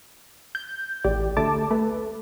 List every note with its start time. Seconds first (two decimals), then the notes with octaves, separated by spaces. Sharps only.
0.55 G6
1.04 A1 G4 D5
1.37 D2 A3 A5 D6
1.71 A3 A4 B4